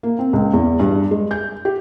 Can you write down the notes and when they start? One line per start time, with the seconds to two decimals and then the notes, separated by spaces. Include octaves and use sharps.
0.03 A#3
0.19 C4
0.33 C#2
0.53 E2
0.80 G2
1.11 G#3
1.31 G6
1.65 G4